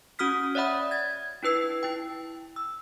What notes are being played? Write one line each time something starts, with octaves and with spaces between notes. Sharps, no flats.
C#4 F#4 D#6 F6 B6
C#5 D5 E5 F#5 B5 D#6
G#6 A6
D4 E4 B4 E6 C7
E4 G5
E6